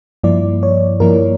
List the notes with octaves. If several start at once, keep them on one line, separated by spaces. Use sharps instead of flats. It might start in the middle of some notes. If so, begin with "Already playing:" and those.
G2 F3 A#3 E4 D5
C#5
G2 F3 A#3 E4 A#4